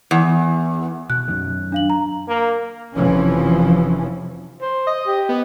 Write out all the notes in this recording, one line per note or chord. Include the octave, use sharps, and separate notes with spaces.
E2
B2 F#6
F#2 D#3
D4 F5 F#7
A#5
A#3
F1 E3 F3 C#4
C5
D#5
G4
B3